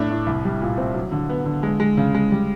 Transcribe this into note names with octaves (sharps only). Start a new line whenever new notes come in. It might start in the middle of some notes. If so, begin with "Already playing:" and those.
Already playing: A2 A3 D4
A2
C2
G3
A#2
C4
F#3
D3
B3
D3
G#3
G#3
C#3
G#3
G3